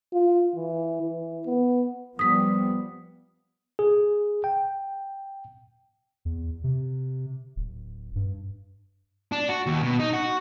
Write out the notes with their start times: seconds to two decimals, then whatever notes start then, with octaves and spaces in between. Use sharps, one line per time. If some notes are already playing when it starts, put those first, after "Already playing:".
0.13 F4
0.56 E3
1.02 E3
1.46 B3
2.19 F3 G3 B3 D#6 B6
3.79 G#4
4.44 G5
6.25 E2
6.64 C3
7.56 D1
8.16 G2
9.32 D4
9.49 F#4
9.67 D#2
9.83 B2
10.00 D#4
10.13 F#4